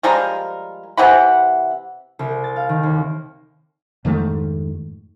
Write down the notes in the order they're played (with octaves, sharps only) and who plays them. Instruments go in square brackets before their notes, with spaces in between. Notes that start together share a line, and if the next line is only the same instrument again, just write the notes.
[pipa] F3 G3 G#3 A#4
C3 E3 F#5 B5
[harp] C2
A6
F5
D#3
D#2
[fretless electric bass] F2 G#2 D#3 A3